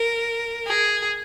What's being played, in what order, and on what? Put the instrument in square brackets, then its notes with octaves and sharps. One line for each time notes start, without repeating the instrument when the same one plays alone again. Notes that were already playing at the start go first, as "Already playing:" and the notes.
Already playing: [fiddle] A#4
G#4